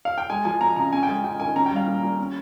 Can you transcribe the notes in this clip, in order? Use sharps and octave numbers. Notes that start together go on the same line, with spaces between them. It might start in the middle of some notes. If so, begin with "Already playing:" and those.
F5
G5
G#3 G#5
F3 G#5
C4 A#5
C#3 A#5
C#4 G#5
G5
G#3
F4 G5
D#3 G#5
C#4 A#5
G5
G3 F5
A#2
A#2
C#4